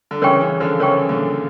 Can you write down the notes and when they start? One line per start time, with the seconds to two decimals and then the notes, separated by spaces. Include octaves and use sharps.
0.11 D3
0.22 C#3 E3 A#4 C#5 G5 C#6
0.41 C#3 E3
0.60 D3 F3
0.80 C#3 E3 A#4 C#5 G5 C#6
1.09 A#2 D3